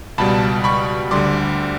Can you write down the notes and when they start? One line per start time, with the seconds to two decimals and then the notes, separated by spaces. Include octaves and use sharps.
0.18 C#2 B2 G3 A5 B5
0.64 B5 C#6
1.11 D2 D3 G3 C6 D6